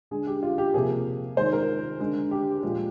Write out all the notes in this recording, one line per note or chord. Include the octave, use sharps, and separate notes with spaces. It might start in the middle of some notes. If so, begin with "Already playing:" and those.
D3 G#3 G#4
G4
F4
G4
C3 F3 A#3 G#4
D#3 G#3 C5
A#4
D3 G#3
G4
A#2 F3 G#3